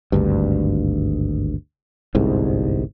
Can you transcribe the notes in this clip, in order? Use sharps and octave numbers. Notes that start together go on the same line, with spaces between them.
G#1 D2 G2
G1 C2 G#2